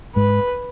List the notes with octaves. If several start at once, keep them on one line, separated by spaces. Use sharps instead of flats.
G#2 G#3 B4